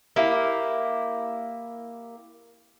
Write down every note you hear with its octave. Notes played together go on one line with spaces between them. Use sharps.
A#3 E4 G4